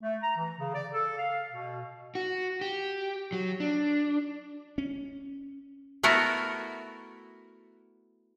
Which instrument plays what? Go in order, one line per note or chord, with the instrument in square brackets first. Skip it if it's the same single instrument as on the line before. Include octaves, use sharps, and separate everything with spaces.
[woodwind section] A3
A#5
E3
C#3
D5
A4
F5
B2
[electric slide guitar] F#4
G4
F#3
D4
[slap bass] C#4
[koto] A3 B3 E4 F#4 A#4